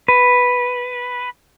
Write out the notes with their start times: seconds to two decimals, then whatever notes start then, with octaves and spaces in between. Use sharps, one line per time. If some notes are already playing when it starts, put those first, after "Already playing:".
0.08 B4